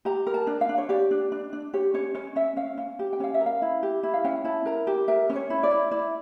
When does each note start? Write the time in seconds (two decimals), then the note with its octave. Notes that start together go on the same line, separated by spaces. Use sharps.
0.05 G4 A#5
0.27 A#4
0.34 A5
0.47 D4
0.61 F5
0.69 D4
0.78 C#5
0.89 G4 D5
1.11 D4
1.32 D4
1.53 D4
1.74 G4 C#5
1.94 C#4 C#5
2.15 C#4 C#5
2.36 C#4 E5
2.57 C#4 F5
2.78 C#4
2.99 G4
3.13 G5
3.20 C#4 F5
3.34 E5
3.41 A#4
3.46 F5
3.62 E4
3.83 G4
4.03 E4
4.14 F5
4.24 C#4 G5
4.44 E4 A5
4.66 A#4 A#5
4.87 G4
5.08 A#4 E5
5.30 C#4
5.35 C#5
5.50 E4
5.63 D5
5.71 E4
5.91 E4 D5